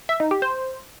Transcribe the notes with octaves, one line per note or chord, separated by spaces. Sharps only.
E5
D#4
G4
C5